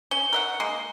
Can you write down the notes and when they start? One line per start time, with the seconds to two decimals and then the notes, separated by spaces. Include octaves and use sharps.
0.11 C#4 G7
0.33 A#4 E5 F#5
0.60 G#3 A#3